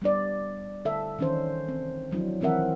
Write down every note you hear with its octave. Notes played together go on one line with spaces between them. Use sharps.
G3 B3 D4 D5
D3 A4 E5
D#3 E3 C#4 D4 C5
C4
F3 F#3 D4 E4
D#3 E3 C4 A#4 E5 F#5